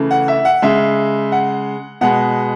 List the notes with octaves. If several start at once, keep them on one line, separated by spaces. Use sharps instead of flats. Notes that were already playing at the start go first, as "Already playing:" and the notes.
Already playing: C#3 E3 A3
F#5
E5
F#5
C#3 G#3 E5
F#5
B2 G#3 F#5